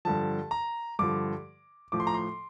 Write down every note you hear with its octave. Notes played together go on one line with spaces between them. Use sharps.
G2 D3 F3 A5
A#5
G2 D3 F3 D6
A2 F3 D6
C6
A#5
C6